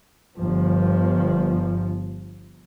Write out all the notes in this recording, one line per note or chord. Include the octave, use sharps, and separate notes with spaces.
G1 F3